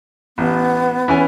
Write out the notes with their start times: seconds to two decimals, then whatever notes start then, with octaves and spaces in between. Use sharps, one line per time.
0.38 A1 B3
1.08 E3 C#4 G#5